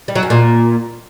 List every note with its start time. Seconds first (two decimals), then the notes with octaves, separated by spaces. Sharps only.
0.08 G3
0.15 F#3
0.23 F#2
0.30 A#2